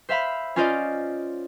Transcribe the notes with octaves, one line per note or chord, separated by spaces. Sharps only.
C5 E5 F5 B5
C#4 F4 C5 D5 D#5